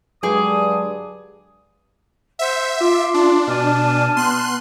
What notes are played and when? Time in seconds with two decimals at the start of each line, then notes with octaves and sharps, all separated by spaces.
0.23 G2 D3 F#3 G#3 G#4 D5 D#6
2.39 C5 E5 F#5
2.81 F4 C6 D6
3.14 D4
3.47 B2 G#5 A5 F6
4.17 B3 C6 F#6